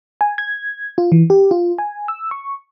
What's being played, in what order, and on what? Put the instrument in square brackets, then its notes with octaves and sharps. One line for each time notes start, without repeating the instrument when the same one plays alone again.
[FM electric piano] G#5
G#6
F4
E3
G4
F4
G#5
E6
C#6